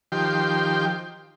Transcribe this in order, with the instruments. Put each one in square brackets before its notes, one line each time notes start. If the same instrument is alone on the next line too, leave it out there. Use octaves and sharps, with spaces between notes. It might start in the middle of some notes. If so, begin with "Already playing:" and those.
[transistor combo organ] D#3 F3 G4 G5 C6